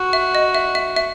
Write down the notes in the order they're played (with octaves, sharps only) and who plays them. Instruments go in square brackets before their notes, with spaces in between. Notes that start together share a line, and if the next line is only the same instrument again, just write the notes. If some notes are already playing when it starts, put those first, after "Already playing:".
Already playing: [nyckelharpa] F#4
[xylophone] E5
D#5
E5
E5
E5